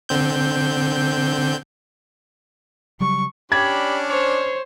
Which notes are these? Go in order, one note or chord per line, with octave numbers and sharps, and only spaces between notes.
D3 C4 G6
C#3 F#3 G3 C#6
C#4 D4 G4 D5 B5 G#6
C5 C#5